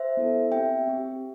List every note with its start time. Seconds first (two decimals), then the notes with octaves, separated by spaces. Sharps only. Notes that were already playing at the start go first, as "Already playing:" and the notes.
Already playing: C5 E5
0.17 B3 E4 A4
0.52 C4 G4 E5 G5
0.87 C4 G4